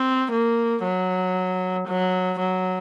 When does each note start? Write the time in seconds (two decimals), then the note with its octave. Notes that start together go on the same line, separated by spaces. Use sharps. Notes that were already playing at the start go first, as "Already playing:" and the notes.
Already playing: C4
0.32 A#3
0.83 F#3
1.88 F#3
2.39 F#3